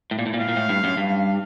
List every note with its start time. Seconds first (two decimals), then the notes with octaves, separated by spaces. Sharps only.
0.11 A2
0.19 A#2
0.26 A2
0.34 A#2
0.40 A2 F5
0.49 A#2
0.56 A2
0.69 G2
0.84 F#2
0.97 G2